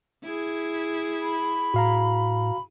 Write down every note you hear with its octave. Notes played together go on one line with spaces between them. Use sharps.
E4 G#4
B5
A2 F#4 F5 A#5